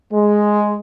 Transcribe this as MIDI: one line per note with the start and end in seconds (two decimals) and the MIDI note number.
0.12 0.78 56